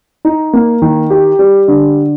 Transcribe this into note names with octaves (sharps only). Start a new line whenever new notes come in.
D#4
A#3
D#3
G4
G3
D3